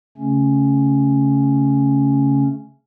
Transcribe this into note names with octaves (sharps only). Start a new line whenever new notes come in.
C#3 A3 C#4